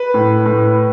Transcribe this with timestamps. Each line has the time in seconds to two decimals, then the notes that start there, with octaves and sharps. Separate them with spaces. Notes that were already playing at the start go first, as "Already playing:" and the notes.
Already playing: B4
0.14 A2
0.46 A2